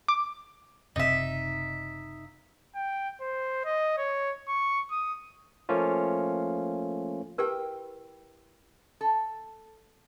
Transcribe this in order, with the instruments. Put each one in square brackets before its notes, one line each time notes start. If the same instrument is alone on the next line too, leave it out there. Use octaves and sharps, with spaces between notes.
[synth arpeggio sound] D6
[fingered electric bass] F#1 C3 C4 [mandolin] D#4 E5
[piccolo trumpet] G5
C5
D#5
C#5
C#6
D#6
[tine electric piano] F3 A3 A#3 C#4 F4
[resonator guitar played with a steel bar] E4 G5 [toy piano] G4 A#4 B4
[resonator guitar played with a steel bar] A4